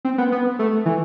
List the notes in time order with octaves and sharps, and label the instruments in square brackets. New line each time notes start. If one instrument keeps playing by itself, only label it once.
[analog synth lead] C4
B3
B3
A3
E3